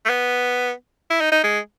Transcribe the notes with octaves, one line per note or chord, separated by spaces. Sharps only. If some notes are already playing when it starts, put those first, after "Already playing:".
A3
B3
E4
D#4
D#4
G#3